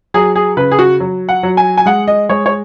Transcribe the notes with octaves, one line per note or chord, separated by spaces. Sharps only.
F#3 G#4
G#4
C#3 B4
G#4
F#4
F#3
F#5
F#3
G#5
G#5
G#3 F#5
D#5
G#3 C#5
C#5